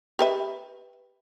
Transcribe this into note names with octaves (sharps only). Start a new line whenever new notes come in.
G4 B4 E5